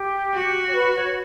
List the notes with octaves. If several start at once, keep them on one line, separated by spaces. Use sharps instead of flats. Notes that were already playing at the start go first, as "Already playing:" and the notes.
Already playing: G4
F#4
C#5
B4
C#5